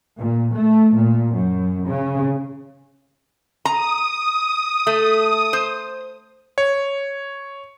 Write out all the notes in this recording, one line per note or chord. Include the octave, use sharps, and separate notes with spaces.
A#2
A3
A#2
F#2
C#3
A#5 D#6
A3
C5
C#5